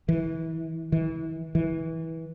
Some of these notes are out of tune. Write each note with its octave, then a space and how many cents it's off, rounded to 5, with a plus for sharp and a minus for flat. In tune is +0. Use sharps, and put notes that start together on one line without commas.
E3 -25
E3 -25
E3 -20